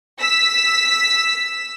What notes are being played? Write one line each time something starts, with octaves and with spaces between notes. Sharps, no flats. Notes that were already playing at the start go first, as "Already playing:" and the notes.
E6 B6